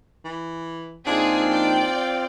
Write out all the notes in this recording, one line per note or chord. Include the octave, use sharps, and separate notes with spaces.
E3
A#1 C4 D4 D#4 F4 G#4 F5
D5 G5